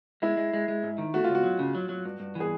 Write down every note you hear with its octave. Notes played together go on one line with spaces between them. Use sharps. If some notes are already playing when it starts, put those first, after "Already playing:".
G#3 E4
G#3
G#3
G#3
G#2
D#3
A3 F#4
C#2 F4
F#4
F#3
C#3
F#3
F#3
G2
G2
E3 G#4